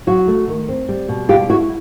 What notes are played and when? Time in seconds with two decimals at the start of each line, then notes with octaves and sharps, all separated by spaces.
0.07 F#3 F#4
0.28 A3
0.48 D#3
0.69 C4
0.89 G3
1.09 B2
1.29 G3 F4 G4
1.49 E4 F#4